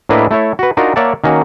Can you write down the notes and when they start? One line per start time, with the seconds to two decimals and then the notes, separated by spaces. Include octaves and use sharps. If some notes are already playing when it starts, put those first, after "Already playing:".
0.09 A2 A#3 D4 E4 B4 D#5
0.31 A3 E4 A4 C#5
0.59 F#4 B4
0.77 D4 D#4 F4 F#4 A#4
0.96 A#3 C#5 D5 E5 F#5 A5
1.24 D#3 A#3 C#4 F#4